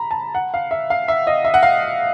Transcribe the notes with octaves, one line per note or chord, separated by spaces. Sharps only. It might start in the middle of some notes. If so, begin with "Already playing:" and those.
Already playing: A#5 B5
A5
F#5
F5
E5
F5
E5
D#5
E5
F#5
F5